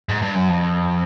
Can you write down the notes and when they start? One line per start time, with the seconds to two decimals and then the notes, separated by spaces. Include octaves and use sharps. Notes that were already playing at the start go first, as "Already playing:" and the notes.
0.09 G#2
0.22 G2
0.35 F#2
0.49 F2